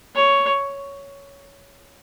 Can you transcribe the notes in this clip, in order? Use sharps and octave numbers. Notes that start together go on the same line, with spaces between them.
C#5